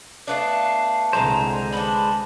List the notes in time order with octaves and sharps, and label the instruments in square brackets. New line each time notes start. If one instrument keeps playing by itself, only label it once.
[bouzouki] A3 B3 D4 [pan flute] F5
[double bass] C2 D3 [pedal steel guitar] G#3 C5 [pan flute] A#5
[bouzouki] B3 D4 [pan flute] B5